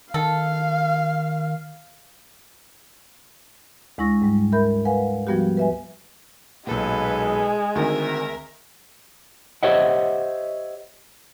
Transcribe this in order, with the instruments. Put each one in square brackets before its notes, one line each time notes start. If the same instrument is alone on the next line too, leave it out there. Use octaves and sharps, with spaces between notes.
[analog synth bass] D#3 [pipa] A4 [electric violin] F5
[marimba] D2 G#3 E4 C#6 A#6
G#2 G3 G#3
A#4 E5 B5 G6
B4 F5 F#5 G#5
F3 G3 B3 F#4 G4
B4 E5 G#5
[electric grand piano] B1 A#2 [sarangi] G#3 [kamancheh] A4 B4
[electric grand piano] D2 D#3 C4 [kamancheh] A#4 E5
[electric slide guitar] G4 C5 C#5 D#5 E5 F#5